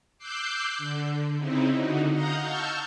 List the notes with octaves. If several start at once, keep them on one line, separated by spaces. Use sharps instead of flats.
D6 E6 F#6 G6 C7
D3
C#3 C4 D#4 E4
D3 D#4 F#4
D#5 F5 F#5 A#5 D#6 G6
A5 C#6 E6 F6 G6